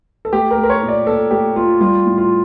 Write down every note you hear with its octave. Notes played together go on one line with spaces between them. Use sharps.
A4
A3 G4
A#4
A3
A#4
C#5
A#2
D5
A#2 A4
A3 G4
A3 F4
G3 F4
A2
F4